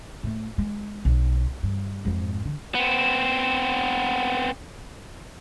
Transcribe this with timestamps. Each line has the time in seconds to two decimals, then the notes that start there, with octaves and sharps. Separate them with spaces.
0.23 A2 A3
0.58 G#3
1.05 B1
1.63 G2
2.05 F2 G#2
2.45 D3
2.75 B3 C4